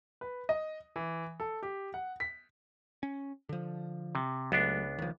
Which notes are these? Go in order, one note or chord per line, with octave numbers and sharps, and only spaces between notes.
B4
D#5
E3
A4
G4
F#5
B6
C#4
D3 F3
C3
C#2 F#3 A3 B3 D4
D#3 F3